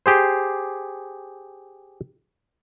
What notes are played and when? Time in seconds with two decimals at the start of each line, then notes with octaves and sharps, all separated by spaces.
0.06 G4 G#4 C5